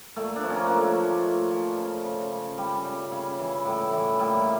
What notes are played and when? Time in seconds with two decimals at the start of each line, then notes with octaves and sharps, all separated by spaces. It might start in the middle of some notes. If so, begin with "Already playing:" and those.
0.16 A#2 A3
0.36 D4
0.43 F3
0.50 C#4
0.56 A#3
0.67 A#2 A#3
0.77 A3
0.97 F3
1.23 A#2
1.51 F3
1.77 C#3
2.05 C#3
2.31 C#3
2.58 C#3 G3
2.85 C#3
3.12 C#3
3.39 E3
3.65 A2
3.92 E3
4.19 A#2 G3